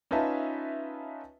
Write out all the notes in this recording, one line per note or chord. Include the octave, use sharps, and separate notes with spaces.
C#4 D#4 F4 B4 E5 A5